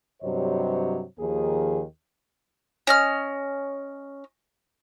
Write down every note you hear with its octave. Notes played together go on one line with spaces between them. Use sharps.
G2 C3 F#3 C5 C#5 D#5
D#2 D#3 F3 A#3 G#4
C#4 D#5 F6